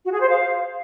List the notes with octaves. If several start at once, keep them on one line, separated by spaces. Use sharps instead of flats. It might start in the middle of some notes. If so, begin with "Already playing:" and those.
F#4
G#4
C5
F5